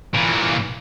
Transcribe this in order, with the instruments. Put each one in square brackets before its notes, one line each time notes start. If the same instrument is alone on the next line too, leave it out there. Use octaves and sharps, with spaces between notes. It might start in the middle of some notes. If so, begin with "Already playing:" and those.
[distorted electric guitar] A#2 E3